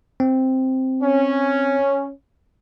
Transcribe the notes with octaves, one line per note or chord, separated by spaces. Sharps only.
C4
C#4